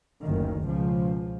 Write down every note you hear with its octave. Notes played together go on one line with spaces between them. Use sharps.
F#1 D2 D#3
C#2 B2 F3